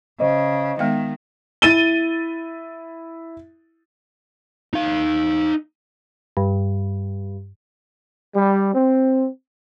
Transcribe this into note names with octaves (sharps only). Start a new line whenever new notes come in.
C#3 C5 D#5
D#3 G#3 B3 F5
E4 A6 D#7 G7
D#4 F5
G2
G3
C4